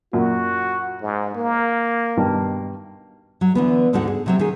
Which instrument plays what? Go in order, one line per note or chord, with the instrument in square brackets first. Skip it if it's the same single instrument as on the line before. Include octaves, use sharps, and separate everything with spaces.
[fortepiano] F#2 A#2 [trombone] F#4
[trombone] G#2
A#3
[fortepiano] G2 B2 D#3
[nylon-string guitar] F#3
D3 E3 B3
D2 G#2 D3 D4 D#4 F#4
G#4
C3 F#3 C4
D#3 G#4